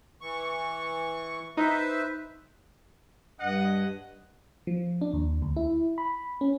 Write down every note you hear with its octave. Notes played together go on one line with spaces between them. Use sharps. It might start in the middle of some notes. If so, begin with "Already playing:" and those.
E3 C#6
D#4 B4 C5 E5
G2 D#5 F#5
F3
D4
D#2
D2
E4
B5
C#4